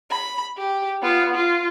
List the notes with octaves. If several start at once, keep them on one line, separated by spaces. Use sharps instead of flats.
B5
G4
B3 F4
F4